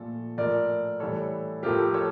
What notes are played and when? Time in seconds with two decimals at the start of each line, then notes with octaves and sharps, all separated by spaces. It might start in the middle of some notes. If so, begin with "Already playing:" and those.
Already playing: A#2 F3 A3 A4
0.38 A2 F3 A3 A#4 D5
1.00 A2 E3 G3 A4 C#5
1.63 A2 F3 A3 G4 A#4
1.94 A4 C#5